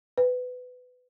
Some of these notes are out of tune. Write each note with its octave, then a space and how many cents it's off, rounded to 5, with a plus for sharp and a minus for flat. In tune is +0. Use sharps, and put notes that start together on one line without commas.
B4 +20